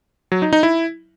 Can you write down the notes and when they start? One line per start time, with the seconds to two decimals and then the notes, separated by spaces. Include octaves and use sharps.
0.32 F#3
0.42 D#4
0.53 D#4
0.63 E4